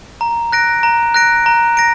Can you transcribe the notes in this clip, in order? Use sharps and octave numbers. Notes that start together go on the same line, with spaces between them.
A#5
F#6 A#6 D7
A#5
F#6 A#6 D7
A#5
A#6 D7